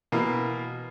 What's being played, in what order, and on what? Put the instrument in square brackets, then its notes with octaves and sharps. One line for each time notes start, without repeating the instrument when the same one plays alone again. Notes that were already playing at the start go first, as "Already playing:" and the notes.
[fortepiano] B2 E3 A#3